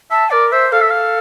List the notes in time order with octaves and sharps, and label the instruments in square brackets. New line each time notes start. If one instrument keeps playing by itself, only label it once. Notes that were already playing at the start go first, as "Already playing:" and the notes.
[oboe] E5 [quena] A5
[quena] A#4 [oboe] D5
[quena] C5 [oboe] E5
[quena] A4 [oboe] F5
[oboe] E5
F5